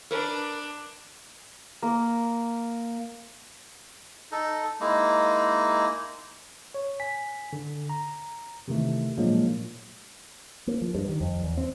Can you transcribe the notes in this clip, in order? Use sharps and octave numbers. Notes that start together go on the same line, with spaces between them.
D4 A#4 B4
A#3
D#4 A4
G#3 A#3 D#4 E4
C#5
G#5 B6
D3
A#5
C3 D#3 E3 A3
A#2 F3 F#3 G#3 A#3 D4
A#3
F3
G2
D#3
F2
E2
C4